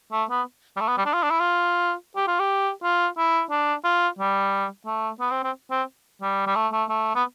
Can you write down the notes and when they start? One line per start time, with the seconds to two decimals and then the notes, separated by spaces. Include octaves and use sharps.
0.12 A3
0.30 B3
0.76 G3
0.80 A3
0.88 B3
0.98 G3
1.06 D4
1.14 F4
1.23 D4
1.31 E4
1.40 F4
2.16 G4
2.27 F4
2.39 G4
2.83 F4
3.18 E4
3.50 D4
3.84 F4
4.19 G3
4.86 A3
5.20 B3
5.31 C4
5.43 C4
5.71 C4
6.22 G3
6.47 G3
6.56 A3
6.72 A3
6.89 A3
7.15 B3